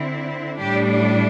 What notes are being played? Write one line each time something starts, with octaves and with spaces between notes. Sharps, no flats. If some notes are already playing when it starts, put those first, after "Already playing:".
Already playing: D3 C4 E4
A2 G3 D4 G4